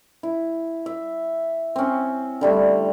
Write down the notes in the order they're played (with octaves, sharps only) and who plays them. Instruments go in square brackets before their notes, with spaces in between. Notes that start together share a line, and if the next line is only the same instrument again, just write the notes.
[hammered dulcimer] E4
E5
C4 C#4
D3 G3 A3